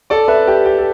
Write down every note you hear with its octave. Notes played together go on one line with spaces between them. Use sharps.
A4 D5
B4 E5
G4
G4
A4